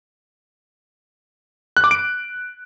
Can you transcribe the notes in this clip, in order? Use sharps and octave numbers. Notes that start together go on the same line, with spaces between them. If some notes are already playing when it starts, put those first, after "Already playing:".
F#6
D6
D7